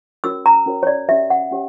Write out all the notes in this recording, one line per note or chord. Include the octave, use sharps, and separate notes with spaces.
C#4 F#4 A#4 C#5 E6
A#5
C#4 F#4 A#4 C#5
C#5
D5
C#4 G4 C#5 E5
F#5
C#4 G4 C#5